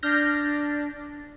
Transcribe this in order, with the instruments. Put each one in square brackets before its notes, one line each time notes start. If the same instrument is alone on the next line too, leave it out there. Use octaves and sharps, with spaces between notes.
[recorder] D4 [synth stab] F6 G6 A#6